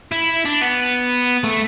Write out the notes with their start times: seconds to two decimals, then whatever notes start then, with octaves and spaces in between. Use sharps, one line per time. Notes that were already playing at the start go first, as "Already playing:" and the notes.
0.12 E4
0.45 D4
0.61 B3
1.44 A3